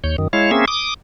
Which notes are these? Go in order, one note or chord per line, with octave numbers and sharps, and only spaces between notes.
D#2 C#5 G6
F#2 D#3
G#3 E4 C#5 F5
A#3 C4 C#4 G#4 E5
D6 D#6